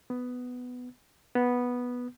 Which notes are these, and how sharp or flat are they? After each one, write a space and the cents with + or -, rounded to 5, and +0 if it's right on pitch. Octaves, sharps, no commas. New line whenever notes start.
B3 +10
B3 -5